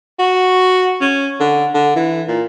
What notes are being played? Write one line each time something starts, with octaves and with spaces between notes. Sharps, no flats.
F#4
C#4
D3
D3
E3
A#2